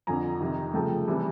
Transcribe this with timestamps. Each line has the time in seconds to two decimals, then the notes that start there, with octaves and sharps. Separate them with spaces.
0.07 F2 D3 F3 G#5 A#5
0.41 F2 C3 D#3
0.74 C#3 F3 A3 G5 A5
1.08 C3 E3 G3